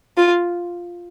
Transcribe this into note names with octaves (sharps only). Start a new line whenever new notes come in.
F4